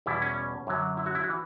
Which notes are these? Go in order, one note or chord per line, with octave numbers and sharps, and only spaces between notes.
E2 B2 G3 E4
C#4
F#2 D3 F#3
E4
F#4
E4
F#4
E3